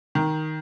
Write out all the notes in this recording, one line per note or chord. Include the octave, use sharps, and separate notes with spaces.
D#3